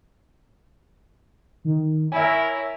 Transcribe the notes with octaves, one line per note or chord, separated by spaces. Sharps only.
D#3
E4 A#4 C#5 E5 G#5